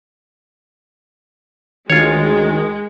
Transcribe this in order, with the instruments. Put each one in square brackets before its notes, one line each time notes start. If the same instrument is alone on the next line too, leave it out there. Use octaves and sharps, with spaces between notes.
[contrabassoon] D2 [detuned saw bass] D#3 [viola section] G#3 [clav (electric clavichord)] F4 C#5